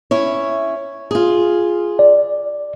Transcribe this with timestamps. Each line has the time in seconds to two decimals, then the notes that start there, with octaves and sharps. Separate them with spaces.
0.11 C#4 E4 C#5
1.11 F4 G#4
1.99 D5